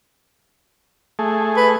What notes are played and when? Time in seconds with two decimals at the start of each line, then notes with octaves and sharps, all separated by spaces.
1.19 A3 G#4
1.57 B4